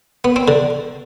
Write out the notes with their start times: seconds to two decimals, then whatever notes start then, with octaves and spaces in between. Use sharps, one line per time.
0.24 B3
0.36 C4
0.48 D3